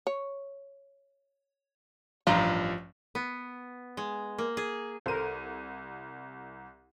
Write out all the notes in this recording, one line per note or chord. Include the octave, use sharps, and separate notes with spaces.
C#5
A1 G2 F3 F4 A#5
B3
G#3
A#3
G#4
C2 A4 A#4 C5 D#7